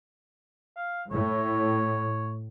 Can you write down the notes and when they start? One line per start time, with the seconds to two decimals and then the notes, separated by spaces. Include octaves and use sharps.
0.77 F5
1.11 A2 C#5